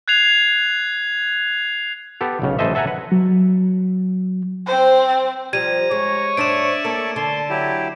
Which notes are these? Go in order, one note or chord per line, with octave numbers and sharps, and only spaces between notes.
F#6 G#6 C7 F7
B3 G4 A4
B1 C#3
A1 E3 A4 C5 D#5 E5
A4 E5 F#5 G#5 A#5
B4 F#5
F#3
C4 C5
F3 G3 A#5 G#6 D#7
G#3 C#5
G2 D4 C5 D5 E5 C#6 D7 E7
A#3 A4
D3 A5 C6
F#3 E4 G4